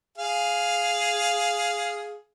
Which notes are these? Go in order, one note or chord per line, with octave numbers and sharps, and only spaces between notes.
G#4 F5